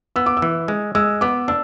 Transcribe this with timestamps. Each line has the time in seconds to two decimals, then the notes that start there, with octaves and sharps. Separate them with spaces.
0.16 B3 E6
0.26 D6
0.37 E6
0.42 E3
0.68 G#3
0.95 G#3 E6
1.21 B3 D6
1.48 D4 E6